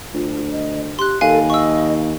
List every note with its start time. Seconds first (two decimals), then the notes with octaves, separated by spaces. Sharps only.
0.14 D2 F4
0.51 D#5
0.99 G4 C6 F#6
1.21 D#2 A4 F5 G#5
1.50 D#5 C#6 E6